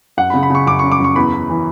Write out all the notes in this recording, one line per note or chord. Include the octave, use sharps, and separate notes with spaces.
F#2 F#5
C#3 B5
B5
C#3 C#6
F#2 D6
C#6
F#2
D6
F#2 C#6
E2 B5
E2
E3